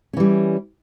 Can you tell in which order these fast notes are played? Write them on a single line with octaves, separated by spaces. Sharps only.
C#4 E3 G3